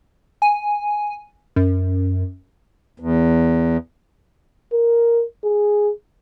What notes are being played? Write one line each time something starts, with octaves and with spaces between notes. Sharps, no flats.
G#5
F#2
E2
A#4
G#4